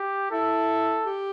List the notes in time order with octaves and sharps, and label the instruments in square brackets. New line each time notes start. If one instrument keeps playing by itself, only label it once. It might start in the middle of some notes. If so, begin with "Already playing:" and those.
Already playing: [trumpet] G4
[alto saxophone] E4 [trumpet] A4
[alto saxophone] G4